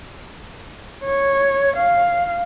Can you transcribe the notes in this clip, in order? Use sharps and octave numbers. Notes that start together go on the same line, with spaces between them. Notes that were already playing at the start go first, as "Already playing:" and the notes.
C#5
F5